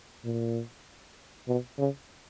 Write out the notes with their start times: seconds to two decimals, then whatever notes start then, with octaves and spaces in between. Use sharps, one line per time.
0.25 A#2
1.48 B2
1.78 C#3